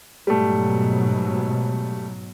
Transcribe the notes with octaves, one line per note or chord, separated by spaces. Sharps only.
G#2 B2 F#3 G3 A3